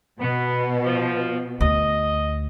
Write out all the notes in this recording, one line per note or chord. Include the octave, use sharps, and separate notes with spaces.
B2 B3
F3
D2 D#5